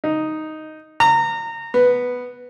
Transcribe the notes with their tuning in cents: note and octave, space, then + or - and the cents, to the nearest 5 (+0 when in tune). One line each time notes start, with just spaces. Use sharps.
D#4 +0
A#5 -25
B3 +0